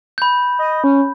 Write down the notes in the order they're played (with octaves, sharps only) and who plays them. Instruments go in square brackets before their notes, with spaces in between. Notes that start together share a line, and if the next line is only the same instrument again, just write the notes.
[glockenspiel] B5 G6
[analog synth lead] D#5
C#4